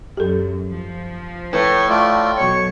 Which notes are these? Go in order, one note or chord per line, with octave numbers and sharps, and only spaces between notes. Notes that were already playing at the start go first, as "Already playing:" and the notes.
F#2 G4 A4
F3
A2 B4 C#5
A3 F4 D5
B2 F#3 C#5 C#6